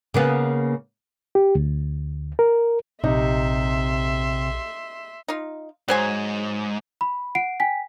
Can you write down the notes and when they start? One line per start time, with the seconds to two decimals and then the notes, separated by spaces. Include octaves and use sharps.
0.14 C#3 A#3 B3
1.35 G4
1.55 D2
2.39 A#4
3.04 A#1 C3 D#4 G4 D#5 E5 C6
5.28 D#4 F4
5.88 G#2 F#3 C5 G#5
7.01 B5
7.35 F#5 C7 D7
7.60 G5 G#5 B6